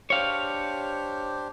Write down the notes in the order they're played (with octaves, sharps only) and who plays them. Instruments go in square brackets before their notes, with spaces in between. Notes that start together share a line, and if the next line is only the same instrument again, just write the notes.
[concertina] D4 G4 C5 [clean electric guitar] C#5 F5